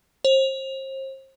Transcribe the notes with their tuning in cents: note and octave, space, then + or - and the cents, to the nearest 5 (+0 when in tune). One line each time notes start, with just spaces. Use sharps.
C5 +35